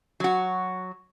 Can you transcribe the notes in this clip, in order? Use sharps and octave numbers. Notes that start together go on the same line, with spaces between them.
F#3 F#4